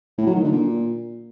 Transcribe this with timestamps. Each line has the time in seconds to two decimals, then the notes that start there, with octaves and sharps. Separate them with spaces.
0.18 A2
0.26 F#3
0.35 D#3
0.43 D3
0.52 A#2